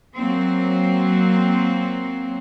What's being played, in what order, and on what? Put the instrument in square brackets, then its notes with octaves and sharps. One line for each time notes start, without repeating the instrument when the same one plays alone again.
[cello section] F#3 A#3 C4